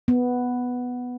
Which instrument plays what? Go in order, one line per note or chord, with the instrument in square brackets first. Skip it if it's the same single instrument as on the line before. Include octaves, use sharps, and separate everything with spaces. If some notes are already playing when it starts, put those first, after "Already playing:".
[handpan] B3